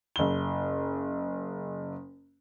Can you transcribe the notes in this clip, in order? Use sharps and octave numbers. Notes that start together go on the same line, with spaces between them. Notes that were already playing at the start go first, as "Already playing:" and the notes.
F#1 G7